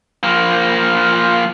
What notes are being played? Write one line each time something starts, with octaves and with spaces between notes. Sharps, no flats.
F3 A#3